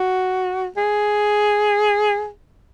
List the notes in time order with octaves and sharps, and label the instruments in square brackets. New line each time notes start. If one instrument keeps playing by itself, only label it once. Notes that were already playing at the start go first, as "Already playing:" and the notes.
Already playing: [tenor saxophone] F#4
G#4